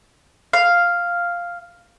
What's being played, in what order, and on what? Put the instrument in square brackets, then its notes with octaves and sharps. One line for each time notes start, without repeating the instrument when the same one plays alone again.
[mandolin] F5